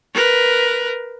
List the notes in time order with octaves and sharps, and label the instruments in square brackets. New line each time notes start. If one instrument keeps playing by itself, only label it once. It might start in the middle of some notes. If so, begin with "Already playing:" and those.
[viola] A#4 B4